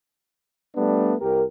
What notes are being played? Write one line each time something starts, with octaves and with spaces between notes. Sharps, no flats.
G3 A3 B3 D4
C2 G4 A#4